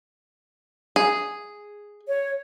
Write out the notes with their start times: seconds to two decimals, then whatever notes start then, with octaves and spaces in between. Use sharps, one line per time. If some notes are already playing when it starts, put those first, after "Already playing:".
0.96 G#4
2.08 C#5